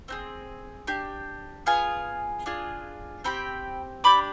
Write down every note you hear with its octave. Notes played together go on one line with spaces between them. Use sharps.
C4 D#4 G#4
D4 G4
B3 F4 G#4 F5 G#5
D4 F4 G#4
C4 G4 G5 B5
D4 G4 B5 D6